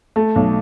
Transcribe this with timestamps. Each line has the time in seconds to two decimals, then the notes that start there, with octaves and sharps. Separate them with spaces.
0.16 A3
0.36 B1